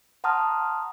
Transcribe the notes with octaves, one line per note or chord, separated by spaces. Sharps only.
F#5 A5 A#5 C6 D#6 F6